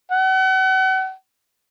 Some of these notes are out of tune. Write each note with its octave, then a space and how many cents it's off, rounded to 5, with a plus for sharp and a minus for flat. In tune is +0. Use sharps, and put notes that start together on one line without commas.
F#5 +35